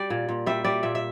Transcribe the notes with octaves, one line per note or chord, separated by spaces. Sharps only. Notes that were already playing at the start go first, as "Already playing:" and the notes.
Already playing: G3 D5
A#2
A#2
G3 E5
G3 D5
A#2 E5
E5